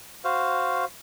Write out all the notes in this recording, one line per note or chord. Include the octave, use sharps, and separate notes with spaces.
F#4 C5 F5